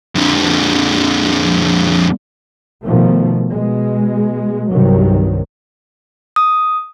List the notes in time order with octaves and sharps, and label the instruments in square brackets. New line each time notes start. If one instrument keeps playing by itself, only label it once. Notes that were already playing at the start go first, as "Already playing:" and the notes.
[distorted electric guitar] F2 D3
[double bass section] B2 D#3 F3 A3
B2 G#3
C2 G2 C3 D#3 F#3
[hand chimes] D#6